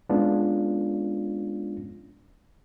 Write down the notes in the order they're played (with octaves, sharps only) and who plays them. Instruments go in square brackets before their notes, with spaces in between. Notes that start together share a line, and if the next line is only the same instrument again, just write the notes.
[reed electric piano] G#3 B3 C#4 D4 F4